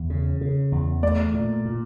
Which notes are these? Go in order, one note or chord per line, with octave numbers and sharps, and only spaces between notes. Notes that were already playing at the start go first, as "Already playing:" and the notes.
Already playing: E2
C#3
C#3
E2
A3 D5
A#2
A#2